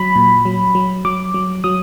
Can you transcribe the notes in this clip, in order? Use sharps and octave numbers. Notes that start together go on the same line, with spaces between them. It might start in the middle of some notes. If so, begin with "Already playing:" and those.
Already playing: F#3 B5
A#2
F#3
F#3
F#3 D6
F#3
F#3 D#6